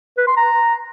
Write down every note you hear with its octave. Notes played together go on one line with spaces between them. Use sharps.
B4
C6
A#5